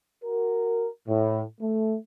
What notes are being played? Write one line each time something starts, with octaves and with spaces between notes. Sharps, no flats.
F#4 A#4
A2
A3